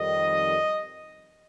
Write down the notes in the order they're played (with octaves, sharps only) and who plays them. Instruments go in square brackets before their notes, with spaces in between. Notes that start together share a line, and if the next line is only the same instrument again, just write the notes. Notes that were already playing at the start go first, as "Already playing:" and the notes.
Already playing: [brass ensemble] F2 D#3 G3 D#5